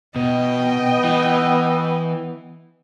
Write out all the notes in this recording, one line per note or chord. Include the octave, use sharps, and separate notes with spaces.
B2 B3 D#5 G5
E3